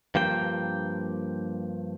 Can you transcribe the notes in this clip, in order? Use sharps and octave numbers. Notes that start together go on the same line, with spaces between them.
G2 F3 A#3 G5